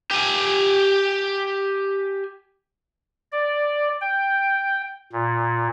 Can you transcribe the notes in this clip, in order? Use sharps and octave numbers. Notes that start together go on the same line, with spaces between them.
G4 G#5
D5
G5
A#2